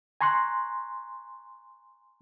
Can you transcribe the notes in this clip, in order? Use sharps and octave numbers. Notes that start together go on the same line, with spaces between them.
G#5 A#5 C6 C#6 F#6